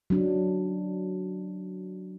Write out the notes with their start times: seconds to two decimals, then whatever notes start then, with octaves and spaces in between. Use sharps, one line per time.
0.10 F#3 D4